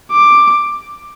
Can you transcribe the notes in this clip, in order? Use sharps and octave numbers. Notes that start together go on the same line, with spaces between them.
D6